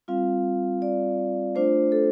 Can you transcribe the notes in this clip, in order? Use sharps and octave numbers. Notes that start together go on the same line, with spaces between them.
G3 C4 F4 F5
D5
A3 D4 F4 C5
A4